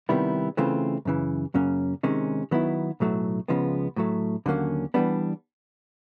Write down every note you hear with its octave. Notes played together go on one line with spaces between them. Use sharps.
C3 D#3 G3 B3 E4
C#3 E3 A3 C4 F4
F#2 C#3 E3
F#2 C#3 F#3 A#3 C#4
C3 D#3 G#3 C#4
D#3 F#3 B3 E4
B1 A2 F#3 A3
C#2 C#3 F3 G#3 B3
A2 F#3 A3
D#2 D3 F#3 A#3 C#4
E3 G3 B3 D4